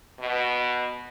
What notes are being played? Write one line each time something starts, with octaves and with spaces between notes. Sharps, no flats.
B2